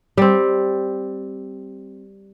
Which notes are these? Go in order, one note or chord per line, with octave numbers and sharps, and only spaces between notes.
G3 C4